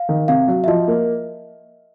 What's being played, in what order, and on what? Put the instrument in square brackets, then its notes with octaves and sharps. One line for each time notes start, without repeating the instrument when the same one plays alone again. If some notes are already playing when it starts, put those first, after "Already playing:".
Already playing: [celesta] F5
[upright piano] D#3
[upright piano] C3 [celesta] F5
[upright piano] F#3
[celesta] E5
[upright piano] F3 [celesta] D#5
[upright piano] A#3